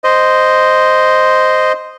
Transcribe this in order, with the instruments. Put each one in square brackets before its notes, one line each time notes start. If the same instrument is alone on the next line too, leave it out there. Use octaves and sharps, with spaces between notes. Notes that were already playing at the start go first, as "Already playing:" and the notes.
[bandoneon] C5 D#5